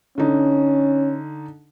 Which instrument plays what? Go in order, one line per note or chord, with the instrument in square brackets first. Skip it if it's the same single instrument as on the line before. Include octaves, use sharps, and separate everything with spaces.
[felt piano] D3 D#4 [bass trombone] C#4